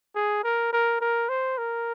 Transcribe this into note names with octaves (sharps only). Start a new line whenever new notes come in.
G#4
A#4
A#4
A#4
C5
A#4